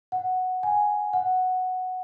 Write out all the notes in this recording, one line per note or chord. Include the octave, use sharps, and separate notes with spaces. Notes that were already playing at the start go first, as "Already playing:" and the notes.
F#5
G#5
F#5